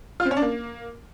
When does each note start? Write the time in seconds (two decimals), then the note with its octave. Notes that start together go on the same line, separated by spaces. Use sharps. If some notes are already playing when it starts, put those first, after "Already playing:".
0.20 F4
0.25 C4
0.31 C#4
0.37 D4
0.42 A#3